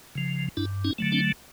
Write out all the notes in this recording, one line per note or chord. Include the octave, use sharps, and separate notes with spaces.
C#3 F3
G2 D4 E4
C#4 D#4
D3 F#3 A3
C4 D4